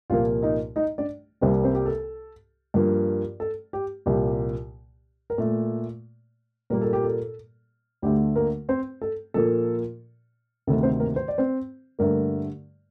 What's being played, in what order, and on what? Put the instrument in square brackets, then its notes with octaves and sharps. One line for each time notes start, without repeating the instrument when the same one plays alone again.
[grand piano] C2 A#2 F3 A#3 F4 F5
D#4 D#5
D#4 D#5
D4 D5
C2 C3 G3 A#3 C4 C5
C4 C5
G4
A4
G2 F3 A#3
A4
G4
C2 A#2 F3 A#3 G4
A#4
A#2 A3 A4
A#2 G3 A#3 A#4
A4
G4
A4
D2 D3 A3 G4
A#3 A#4
C4 C5
A4
A#2 F3 A#3 A4
D2 C3 D#3 A4
C4 C5
A#3 A#4
C5
D5
C4 C5
G2 D3 A3 A#3 A#4